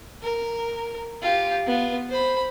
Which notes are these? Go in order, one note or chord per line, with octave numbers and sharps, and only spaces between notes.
A#4
F4 G4
B3 F4
C5 B5